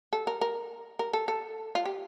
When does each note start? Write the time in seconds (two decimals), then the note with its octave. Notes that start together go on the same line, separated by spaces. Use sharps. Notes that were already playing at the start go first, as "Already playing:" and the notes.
0.13 A4
0.27 A#4
0.41 A#4
0.99 A#4
1.13 A4
1.28 A4
1.75 F4
1.85 G4